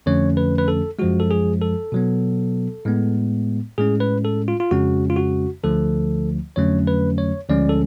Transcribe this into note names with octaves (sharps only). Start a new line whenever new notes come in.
F2 D3 F3 A3 C#4 C#5
B4
B4
A4
F#2 F3 G#3 F#4
A4
G#4
A4
B2 F#3 B3
A2 G#3 B3
A2 G#3 C#4 G#4
B4
A4
F4
F4
F2 C#3 G#3 C#4 F#4
F4
F#4
D2 D3 F3 A3 A4
F2 D3 F#3 A3 C#4 C#5
B4
C#5
D2 D3 F3 G#3 C#4 D5
A4